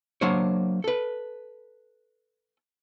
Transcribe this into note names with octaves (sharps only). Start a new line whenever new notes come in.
F#3 A#3 D4 C5 C#5
A4 B4